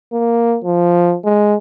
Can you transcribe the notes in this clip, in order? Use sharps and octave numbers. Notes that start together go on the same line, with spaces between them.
A#3
F3
G#3